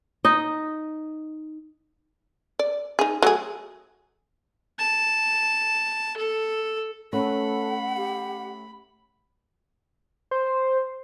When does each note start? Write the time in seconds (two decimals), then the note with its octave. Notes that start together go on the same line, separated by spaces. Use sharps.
0.25 D#4 D#5
2.59 D5
2.99 D#4 G#4
3.22 F#3 A3 G#4
4.78 A5
6.17 A4
7.13 A3 C#4 A4 B4 F#5 B5
7.97 G4
10.31 C5